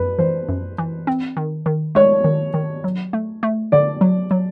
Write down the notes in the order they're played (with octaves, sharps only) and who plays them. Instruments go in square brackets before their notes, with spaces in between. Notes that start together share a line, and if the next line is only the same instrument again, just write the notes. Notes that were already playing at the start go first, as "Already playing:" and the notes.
Already playing: [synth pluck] F#2 [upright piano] B4
[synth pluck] E3 [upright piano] C5
[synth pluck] F#2
E3
C4
D#3
D#3
[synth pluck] G#3 [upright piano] C#5
[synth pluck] D#3
D#3
F#3
A3
A3
[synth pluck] D3 [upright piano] D5
[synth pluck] F#3
F#3